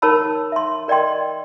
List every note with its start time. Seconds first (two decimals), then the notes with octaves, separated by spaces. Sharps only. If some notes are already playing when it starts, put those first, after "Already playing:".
0.02 D#4 A#4 C#5 A5 B5 E6
0.52 E5 C6
0.88 A#4 D5 D#5 G5 C6